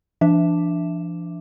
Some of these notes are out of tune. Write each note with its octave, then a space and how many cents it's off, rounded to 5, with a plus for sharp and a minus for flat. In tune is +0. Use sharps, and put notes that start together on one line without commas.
F3 -45 D4 +0 E5 +0